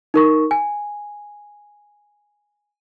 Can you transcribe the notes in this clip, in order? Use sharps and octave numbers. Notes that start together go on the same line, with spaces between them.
D#4 A#4 C#6
G#5